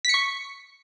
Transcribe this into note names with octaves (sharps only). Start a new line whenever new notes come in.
C#6 B6 C#7